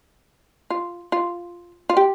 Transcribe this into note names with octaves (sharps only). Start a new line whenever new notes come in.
F4
F4
F4
G4